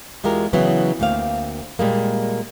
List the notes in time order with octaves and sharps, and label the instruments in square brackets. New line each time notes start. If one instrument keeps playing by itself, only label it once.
[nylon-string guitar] E2 G#3 F4 G4 A#4
C#3 E3 F#3 B3
D2 A#3 C4 F5
A#2 G3 G#3 A#3